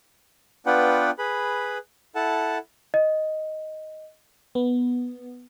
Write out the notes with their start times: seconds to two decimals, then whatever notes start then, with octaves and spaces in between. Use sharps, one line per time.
0.66 B3 D4 F4 B4 F#5 G5
1.19 G#4 B4 B5
2.15 E4 A4 F#5 A5
2.94 D#5
4.55 B3